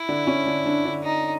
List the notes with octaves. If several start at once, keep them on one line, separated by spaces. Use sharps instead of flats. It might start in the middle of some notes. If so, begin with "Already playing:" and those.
Already playing: E4
D3 D4
C#4
D3 D4
D3 D4
D3 D4
D#4